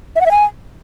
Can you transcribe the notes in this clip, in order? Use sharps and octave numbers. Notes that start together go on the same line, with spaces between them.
E5
F#5
E5
G#5